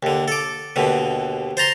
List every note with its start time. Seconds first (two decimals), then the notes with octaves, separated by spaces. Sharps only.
0.03 D#2 D3
0.28 A4 D6
0.76 D#2 B2 D3
1.57 C5 A5 A#5 C6